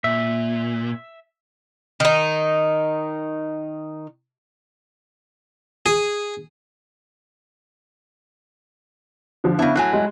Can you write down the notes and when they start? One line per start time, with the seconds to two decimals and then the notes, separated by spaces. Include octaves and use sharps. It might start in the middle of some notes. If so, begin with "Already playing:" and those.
0.04 A#2 E5
2.00 D#3 D#4
5.86 G#4
9.44 D3 F3 D4
9.59 C#3 B3 D4 E4
9.75 A2 F#3 G#5 F#6
9.93 G3 G#3